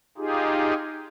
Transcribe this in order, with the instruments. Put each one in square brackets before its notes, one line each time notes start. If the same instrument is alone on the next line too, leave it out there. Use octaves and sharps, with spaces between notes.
[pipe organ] D#4 F4 G4 G#4